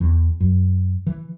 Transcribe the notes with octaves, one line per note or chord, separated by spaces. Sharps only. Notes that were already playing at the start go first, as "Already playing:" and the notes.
E2
F#2
E3